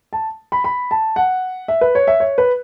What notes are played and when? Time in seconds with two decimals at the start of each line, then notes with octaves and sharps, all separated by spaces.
0.13 A5
0.52 B5
0.64 B5
0.91 A5
1.16 F#5
1.68 E5
1.81 B4
1.95 C#5
2.07 E5
2.20 C#5
2.38 B4